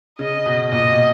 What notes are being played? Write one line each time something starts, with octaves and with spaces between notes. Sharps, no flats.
C#3 D#5
B2
A#2 D#5
B2